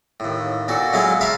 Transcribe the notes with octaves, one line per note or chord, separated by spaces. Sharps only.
D#2 A2
A#2 F#4 A4
F#3 G#3 E4 A4 F5
A#4 E5 F5 A5 B5 C6